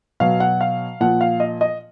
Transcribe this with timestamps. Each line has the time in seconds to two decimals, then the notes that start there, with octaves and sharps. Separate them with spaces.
0.20 B2 F#3 F5
0.40 F#5
0.61 F5
1.00 A#2 F3 F#5
1.21 F5
1.40 D#5
1.61 D#5